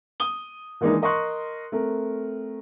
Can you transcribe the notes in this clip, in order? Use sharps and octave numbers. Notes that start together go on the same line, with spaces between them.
D#6 G7
D#3 E3 G#3 A#3 D4 D#4
A#4 D#5 C6 C#6 F#6
A3 C4 A#4